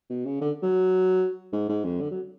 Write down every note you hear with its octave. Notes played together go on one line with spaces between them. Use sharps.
B2
C#3
D3
F#3
G#2
G#2
F2
D3
F#3